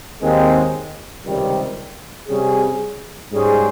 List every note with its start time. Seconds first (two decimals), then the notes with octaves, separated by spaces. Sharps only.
0.22 D#2 D#3 G#3 C4
1.25 C#2 C3 D#3 G3
2.28 C3 G3 C#4 G#4
3.32 G#2 G3 C#4 G#4 C5